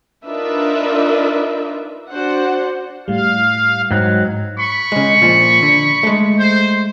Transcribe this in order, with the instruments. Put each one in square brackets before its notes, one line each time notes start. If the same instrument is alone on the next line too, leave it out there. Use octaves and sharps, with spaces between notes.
[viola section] D4 D#4 F4 A#4 B4 E5
D4 F#4 C5 F#5
[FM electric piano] A2 G3 [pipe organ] F5
[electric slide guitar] G#2 F#3 [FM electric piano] G5
[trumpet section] B5 C#6
[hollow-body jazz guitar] C#3 G#3
A#2 F3
D3
G#3 A3
[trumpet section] C5